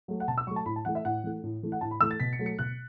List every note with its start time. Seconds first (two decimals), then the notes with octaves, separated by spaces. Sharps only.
0.08 F#3 A3
0.20 F#5
0.28 B2 A5
0.38 E6
0.47 F#3 C#6
0.51 A3
0.56 A5
0.66 A2 B5
0.76 A5
0.85 E3 A3 F#5
0.95 E5
1.05 A2 F#5
1.24 E3 A3
1.43 A2
1.63 E3 A3
1.72 F#5
1.81 A2 A5
1.91 B5
2.01 E3 A3 E6
2.11 A6
2.20 B2 B6
2.33 C#7
2.39 F#3 A3
2.46 C#7
2.59 B2 F#6